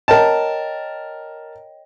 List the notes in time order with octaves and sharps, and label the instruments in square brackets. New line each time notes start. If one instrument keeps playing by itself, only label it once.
[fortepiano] A#4 A5 [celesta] C#5 D#5 G5